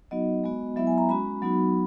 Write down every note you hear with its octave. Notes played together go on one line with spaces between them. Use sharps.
F#3 B3 D#4 F#4 D#5
G#3 B3 F#4
F#3 B3 E4 E5
G#5
A#5
G#3 C#4 F#4 B5
F#3 B3 D#4 F#4